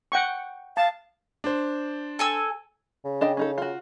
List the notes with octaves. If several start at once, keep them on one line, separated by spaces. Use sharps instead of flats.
F#5 G5 C#6
F5 A5
D4 C5
A4 G#5 E6
C#3
D4 D#5 G5
C#4 D#4 A4
F4 F#4